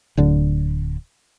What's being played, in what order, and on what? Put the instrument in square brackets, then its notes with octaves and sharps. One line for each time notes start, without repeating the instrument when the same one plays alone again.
[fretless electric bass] D1 D3